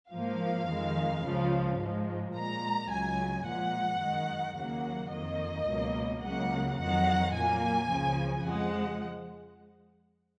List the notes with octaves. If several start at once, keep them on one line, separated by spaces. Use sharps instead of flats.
G#2 F3 A#3 F5
F2 D#3 G#3
C#2 C#3 F3
G#2 F3 G#3
A#2 G#3 A#5
C#2 C#3 F#3 G#5
A#2 F3 G#3 F#5
F#2 D#3 G#3
D#2 C#3 F#3 A#3 F#5
F2 D#3 A#3 D#5
C#2 B2 F#3 A#3
C#2 C#3 F#3 A#3 F#5
F2 D#3 F#3 F#5
A#2 F#3 A#3 G#5
C#2 C#3 F3
F2 F3 G#3 F#5